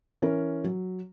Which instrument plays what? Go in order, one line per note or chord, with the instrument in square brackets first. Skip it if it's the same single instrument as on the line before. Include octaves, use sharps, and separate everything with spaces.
[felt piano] E3 C#4 A#4
F#3